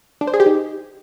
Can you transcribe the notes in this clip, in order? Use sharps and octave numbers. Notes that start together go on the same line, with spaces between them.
D4
C5
G#4
G4
D#4